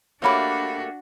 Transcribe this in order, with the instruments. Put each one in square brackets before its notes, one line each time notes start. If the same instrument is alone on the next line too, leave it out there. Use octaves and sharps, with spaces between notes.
[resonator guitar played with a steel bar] A3 A#3 G4 [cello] D4 F#4 [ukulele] C5 C#5 B5